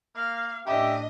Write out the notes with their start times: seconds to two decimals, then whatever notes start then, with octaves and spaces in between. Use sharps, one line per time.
0.16 A#3 F5
0.66 A2 C#4 D4 G4 D#5 E5